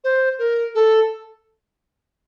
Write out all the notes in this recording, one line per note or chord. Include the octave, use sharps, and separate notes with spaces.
C5
A#4
A4